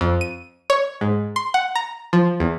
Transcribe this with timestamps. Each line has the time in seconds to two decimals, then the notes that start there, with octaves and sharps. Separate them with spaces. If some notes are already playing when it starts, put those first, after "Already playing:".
0.01 F2
0.21 D#7
0.70 C#5
1.01 G#2
1.36 C6
1.54 F#5
1.75 A#5
2.13 F3
2.40 E2